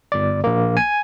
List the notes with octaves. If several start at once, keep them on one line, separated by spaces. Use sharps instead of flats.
G1 D5
A#1 A#3
G#5